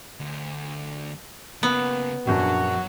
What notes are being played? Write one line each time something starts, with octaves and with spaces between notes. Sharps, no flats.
D2
C#3 A#3 B3
A#1 F#2 F#3 D4 F#4